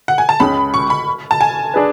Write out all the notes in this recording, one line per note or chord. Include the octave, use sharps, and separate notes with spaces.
F#5
G#5
A5
C#2 C#3 G#3 B5
C#6
B5
A5
G#5
D4 G#4 B4